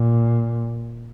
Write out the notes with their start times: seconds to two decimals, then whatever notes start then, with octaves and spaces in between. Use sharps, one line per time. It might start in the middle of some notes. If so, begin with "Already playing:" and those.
Already playing: A#2